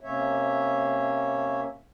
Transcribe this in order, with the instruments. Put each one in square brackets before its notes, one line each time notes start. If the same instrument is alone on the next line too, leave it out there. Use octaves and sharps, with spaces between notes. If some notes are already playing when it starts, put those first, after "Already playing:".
[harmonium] C3 A#3 C#4 C#5 E5